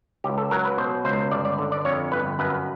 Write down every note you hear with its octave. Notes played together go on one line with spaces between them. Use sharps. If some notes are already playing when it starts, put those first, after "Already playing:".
C#2 G4
A4
F#3 A#4
B4
B2 C5
C#2 C5
G1 D5
D5
D3
D5
F2 C#5
G1 B4
F#2 B4